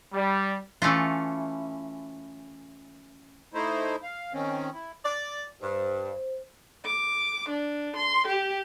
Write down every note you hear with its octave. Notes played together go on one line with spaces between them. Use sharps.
G3
E3 A3 C#4 F4
A3 D#4 E4 C5
F5
D#3 C4 C#4
E4
D5
G2 C5
D6
D4
C6
G4